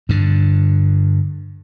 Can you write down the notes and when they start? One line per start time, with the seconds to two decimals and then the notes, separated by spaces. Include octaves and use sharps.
0.09 G2 D3